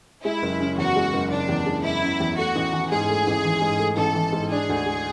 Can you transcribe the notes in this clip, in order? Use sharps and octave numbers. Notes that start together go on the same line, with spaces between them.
G#3 E4
F#1
C#3
E2 F#4
G#3
F#1
C#3 D4
E2
G#3
F#1 E4
C#3
E2
A3 F#4
A1
E3
G#2 G#4
A3
A1
E3
G#2
A3
A1 A4
E3
G#2
D4 G#4
D2
G#3